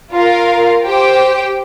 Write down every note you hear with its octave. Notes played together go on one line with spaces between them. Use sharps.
F4 A#4 F5
G4 C5 G5